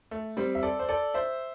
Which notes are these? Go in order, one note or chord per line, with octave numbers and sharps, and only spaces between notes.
A3
G3 C4
E5
A4 D5
C5
A4 D5
C5 E5